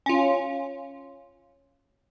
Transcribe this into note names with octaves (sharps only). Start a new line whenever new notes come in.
C#4 F4